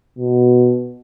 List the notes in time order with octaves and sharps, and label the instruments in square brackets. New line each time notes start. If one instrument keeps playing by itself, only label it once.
[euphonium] B2